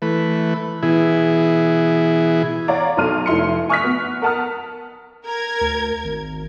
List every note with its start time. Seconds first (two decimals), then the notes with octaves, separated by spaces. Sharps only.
0.02 E3 A3 B4
0.83 B2 E3 E4 G#4
2.68 C#5 D5 F5 F#5 A#5
2.97 B1 A4 C6 F6 D#7
3.26 F1 E4 C6 C#7
3.69 G#5 C#6 D#6 F6 F#6 B6
3.84 B3
4.22 A#4 F#5 A5 D#6 F6
5.24 A#4 G#6
5.61 D2
6.04 G#1